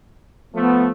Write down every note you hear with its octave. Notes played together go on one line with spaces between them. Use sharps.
F3 A3 B3